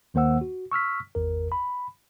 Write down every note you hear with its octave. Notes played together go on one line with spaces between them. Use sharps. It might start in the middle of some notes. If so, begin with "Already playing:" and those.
D#2 D#3 A#3 C5 F#5 E6
F#4
C#6 E6 F6 B6
G#1 E2 A#4
B5